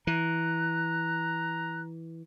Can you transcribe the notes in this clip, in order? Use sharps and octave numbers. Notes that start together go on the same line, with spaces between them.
E3 A#5 F#6